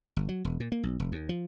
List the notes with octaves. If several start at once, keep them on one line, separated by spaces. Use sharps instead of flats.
G1
F#3
E1
A#2
A#3
B1
F1
D#2
F3